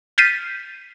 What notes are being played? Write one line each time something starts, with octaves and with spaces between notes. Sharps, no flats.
F6 G6 A6 B6 C7 D#7